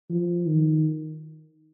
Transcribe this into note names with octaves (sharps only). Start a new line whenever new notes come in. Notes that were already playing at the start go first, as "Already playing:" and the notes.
F3
D#3